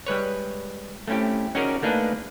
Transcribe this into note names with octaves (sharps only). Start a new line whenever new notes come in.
G3 G#3 B4 C#5
A3 C4 C#4 E4 G4
C#4 D#4 F#4 G#4 A#4 D5
A3 A#3 D4 D#4 G#4 B4